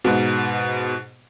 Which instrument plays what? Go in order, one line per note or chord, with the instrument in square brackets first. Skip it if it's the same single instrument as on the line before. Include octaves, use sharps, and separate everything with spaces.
[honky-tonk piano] G#2 B2